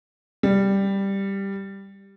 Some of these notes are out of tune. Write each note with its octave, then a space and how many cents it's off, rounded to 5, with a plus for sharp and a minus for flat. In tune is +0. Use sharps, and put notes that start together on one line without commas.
G3 +5